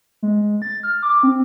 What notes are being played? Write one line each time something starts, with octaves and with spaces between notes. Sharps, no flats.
G#3
A6
F6
D6
C4